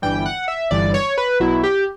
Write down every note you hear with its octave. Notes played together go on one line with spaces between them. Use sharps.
G1 G2 E3 G3 G5
F#5
E5
G1 G2 E3 G3 D5
C#5
B4
B1 B2 F#3 E4
G4